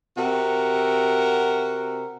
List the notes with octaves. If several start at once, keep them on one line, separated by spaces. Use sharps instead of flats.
C3 F#4 A#4